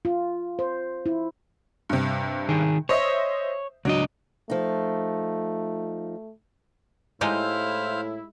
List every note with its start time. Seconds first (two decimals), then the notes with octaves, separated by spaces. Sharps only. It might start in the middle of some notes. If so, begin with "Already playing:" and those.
0.05 F4
0.59 C5
1.06 E4
1.89 G2 C3
2.49 D#3 G#4
2.89 C5 C#5 D#5 E5
3.85 C#2 F#3 D4 D#5
4.50 F3 A3 D#4
7.21 A2 G#3 D#4 E4 G4 C5 F5